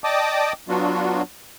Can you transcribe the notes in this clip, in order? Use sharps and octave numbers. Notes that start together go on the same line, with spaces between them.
D5 D#5 G5 A5 D6 D#6
F#3 B3 D4 F4 F#4